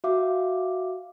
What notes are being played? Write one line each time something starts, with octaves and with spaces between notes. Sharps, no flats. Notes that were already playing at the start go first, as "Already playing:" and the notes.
F#4 E5 F5 D6